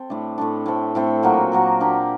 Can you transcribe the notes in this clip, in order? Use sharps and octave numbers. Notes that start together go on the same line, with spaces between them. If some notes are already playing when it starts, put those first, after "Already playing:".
Already playing: C4 A4
A2 A3 D4
A2 A3 D4
A2 A3 C4
A2 A3 C4
A#2 F#3 A#3 F#4
A#2 F#3 A#3 F#4
A#3 D4 G4